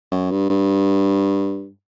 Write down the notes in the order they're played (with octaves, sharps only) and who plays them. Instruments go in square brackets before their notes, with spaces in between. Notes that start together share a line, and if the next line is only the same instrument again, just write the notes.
[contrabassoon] F#2
G2
G2